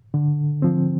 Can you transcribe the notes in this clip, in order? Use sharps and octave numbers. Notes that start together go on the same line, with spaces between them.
D3
F3 C4